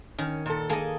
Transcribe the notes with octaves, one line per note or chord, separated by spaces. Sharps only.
D#3 C#4
A#2 A4
A#3 G#4 A4 D#5